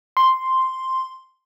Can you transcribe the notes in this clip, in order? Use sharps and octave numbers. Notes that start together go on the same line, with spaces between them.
C6